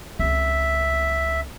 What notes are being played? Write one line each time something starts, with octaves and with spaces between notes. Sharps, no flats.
C#2 C4 E5